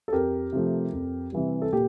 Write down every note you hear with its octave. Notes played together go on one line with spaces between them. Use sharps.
A4
F2 G4 A#4
C3 F3 A3
F2
C3 E3 G3
A4
A#2 G4